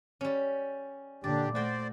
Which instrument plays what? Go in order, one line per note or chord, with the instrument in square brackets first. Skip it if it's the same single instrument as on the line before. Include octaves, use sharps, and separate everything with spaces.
[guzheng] G3 C#4
[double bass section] A#2 D3 [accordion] D4 G4 [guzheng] D5
[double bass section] A3 [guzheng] F#4 G5 [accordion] C5 D5